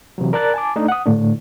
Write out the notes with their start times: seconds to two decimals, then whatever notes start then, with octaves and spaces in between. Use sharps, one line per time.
0.18 C3 E3 F#3
0.33 A#4 D5 A5 F#6 A6
0.54 G#5 A5 D6
0.76 A3 D4 D#4
0.88 F#5 D#6
1.06 A2 D3 A3 D4